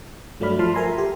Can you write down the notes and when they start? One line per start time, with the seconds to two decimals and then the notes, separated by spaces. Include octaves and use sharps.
0.40 G2 F#3 A3 D5 B5 F6
0.59 F3 A5 B5 C6 F6
0.74 A4 A#4 E5 G#5 A#5 C6
0.98 G4